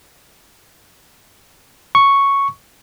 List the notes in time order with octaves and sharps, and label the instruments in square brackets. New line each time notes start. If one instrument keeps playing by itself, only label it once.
[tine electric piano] C#6